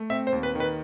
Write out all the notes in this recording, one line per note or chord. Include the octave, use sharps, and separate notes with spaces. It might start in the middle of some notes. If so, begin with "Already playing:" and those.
Already playing: A3
C4 E5
C5
D#2
B4
D#3
B4